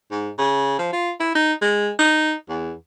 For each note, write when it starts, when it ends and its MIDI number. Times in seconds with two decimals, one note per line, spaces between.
0.11 0.29 44
0.38 0.78 49
0.79 0.90 53
0.93 1.11 65
1.20 1.32 64
1.35 1.53 63
1.61 1.90 56
1.99 2.33 63
2.49 2.72 40